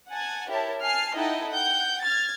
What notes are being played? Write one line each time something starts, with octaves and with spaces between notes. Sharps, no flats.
F#5 G#5 A5
E4 G4 A#4 C#5 A5
G#5 A5 F6 C7
D#4 E4 A4 D#5 F#5 G5
F#5 G5 G6
F6 G#6 A6